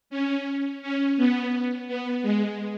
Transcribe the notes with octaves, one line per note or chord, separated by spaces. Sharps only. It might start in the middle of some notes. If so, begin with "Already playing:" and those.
C#4
C#4
B3
B3
G#3